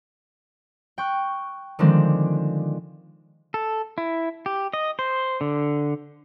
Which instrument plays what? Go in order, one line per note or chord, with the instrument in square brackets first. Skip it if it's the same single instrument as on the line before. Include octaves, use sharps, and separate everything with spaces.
[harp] G5 C#6 F#6
D3 D#3 F3 G#3 C4 D4
[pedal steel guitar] A4
E4
G4
D#5
C5
D3